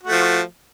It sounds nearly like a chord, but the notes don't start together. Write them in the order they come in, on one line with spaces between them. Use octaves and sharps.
F#4 A3 F3